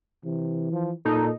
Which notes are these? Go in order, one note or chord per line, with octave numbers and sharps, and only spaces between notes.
C3 E3
F3
A#2 D#4 A4